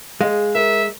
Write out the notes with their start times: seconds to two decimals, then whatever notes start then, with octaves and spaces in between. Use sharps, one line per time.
0.21 G#3 G#4 F5
0.55 A#4 E5